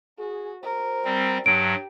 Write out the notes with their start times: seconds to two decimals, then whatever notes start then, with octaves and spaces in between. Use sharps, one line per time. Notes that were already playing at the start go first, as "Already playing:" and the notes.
0.19 F#4 G#4
0.63 F#4 A#4 C5
1.05 G3 C4
1.46 G2 F#3 G4 D7